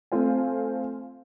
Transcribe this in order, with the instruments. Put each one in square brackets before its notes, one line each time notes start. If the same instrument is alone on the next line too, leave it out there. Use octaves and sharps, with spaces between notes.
[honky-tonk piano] A3 C4 F4 C5 G#5